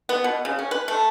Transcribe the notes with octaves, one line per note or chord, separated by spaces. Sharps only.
B3
B2
C#3
C#4
B4
A3